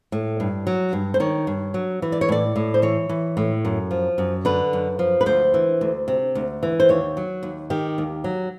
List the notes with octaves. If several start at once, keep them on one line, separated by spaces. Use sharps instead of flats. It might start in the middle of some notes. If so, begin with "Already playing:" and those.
A2
G2
F#3
G2
C5
D#3 C#5
G2
F#3
E3
D5
C#5
A2 D5
A2
C5
E3 C#5
E3
A2
F#2
F3
F#2
D3 B4
F#2
F3
B4
D2 C5
E3
D2
C3
D2
E3
C5
D#2 C#5
F#3
D#2
D#3 G4
D#2
F#3